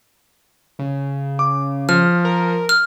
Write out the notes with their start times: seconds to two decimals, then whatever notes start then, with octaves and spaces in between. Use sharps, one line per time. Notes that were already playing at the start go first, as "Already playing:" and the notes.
0.79 C#3
1.39 D6
1.89 F3 F6
2.25 A#4
2.69 F6